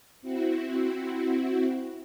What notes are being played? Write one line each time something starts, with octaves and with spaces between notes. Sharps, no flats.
C4 E4 F#4